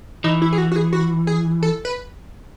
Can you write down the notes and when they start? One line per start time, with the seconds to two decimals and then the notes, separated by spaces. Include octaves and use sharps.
0.24 E3 D#4
0.42 E4
0.53 G#4
0.58 F#4
0.72 F#4
0.76 G#4
0.93 F#4
1.27 G#4
1.63 A4
1.85 B4